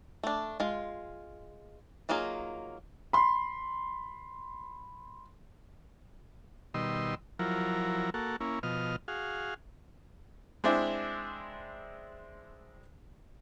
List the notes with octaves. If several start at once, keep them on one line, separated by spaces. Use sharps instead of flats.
A3 D4
G#3 F4
F#3 A#3 D#4 F4 G#4
B5 C6
B2 D#3 G3 D#5 C6 E6
F3 F#3 E4 A#4
A#3 F#4 A4
A#3 C#4 E4
B2 F3 D#5 F6
F#4 G#4 F5
G#3 C4 D4 E4